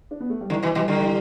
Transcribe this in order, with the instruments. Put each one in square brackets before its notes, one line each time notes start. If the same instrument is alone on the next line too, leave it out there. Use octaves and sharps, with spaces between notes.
[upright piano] D4
B3
A3
G3
[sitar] D3 [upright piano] E3
[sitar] B2 E3
[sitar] B2 E3 [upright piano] G3
[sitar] D3 G3
[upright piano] E3